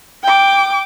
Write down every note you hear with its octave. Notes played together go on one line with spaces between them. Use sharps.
G5 D6